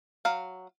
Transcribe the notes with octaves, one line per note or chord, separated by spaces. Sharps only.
F#3 F5